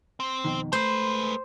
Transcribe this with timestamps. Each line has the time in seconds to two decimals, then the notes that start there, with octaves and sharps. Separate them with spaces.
0.20 C4
0.45 F2 B2 D#3
0.73 G#3 A3 B4 C5